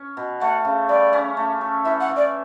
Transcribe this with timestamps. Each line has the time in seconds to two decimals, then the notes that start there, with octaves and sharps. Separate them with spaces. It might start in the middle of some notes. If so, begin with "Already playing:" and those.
Already playing: C#4
0.17 B2
0.41 A3 F#5
0.65 C#3
0.89 G3 D5
1.13 C#4
1.37 A3
1.61 A4
1.85 E3 E5
2.00 F#5
2.09 E3
2.16 D5